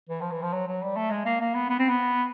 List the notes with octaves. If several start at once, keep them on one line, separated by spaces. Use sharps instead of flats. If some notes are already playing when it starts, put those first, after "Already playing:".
E3
F3
E3
F3
F#3
F#3
G3
A3
G#3
A#3
A#3
B3
B3
C4
B3